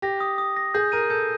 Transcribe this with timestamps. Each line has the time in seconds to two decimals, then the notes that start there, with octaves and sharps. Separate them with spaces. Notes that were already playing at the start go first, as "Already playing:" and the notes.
0.02 G4 A#6
0.20 D#6
0.38 D#6
0.56 A#6
0.74 G#4 G6
0.92 A#4 D#7
1.10 A4 G6